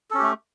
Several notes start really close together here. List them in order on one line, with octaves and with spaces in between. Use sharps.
A4 C#4 G4 A3